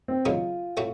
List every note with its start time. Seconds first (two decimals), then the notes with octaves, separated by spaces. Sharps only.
0.08 C4
0.25 D#2 C#3 F#3 A#3 D#4 F4
0.77 A2 A3 C4 F#4